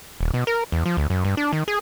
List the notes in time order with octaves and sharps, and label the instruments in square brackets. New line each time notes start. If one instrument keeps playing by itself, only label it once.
[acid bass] D#1
B2
A#4
E2
F3
D2
F#2
G2
D4
D#3
G#4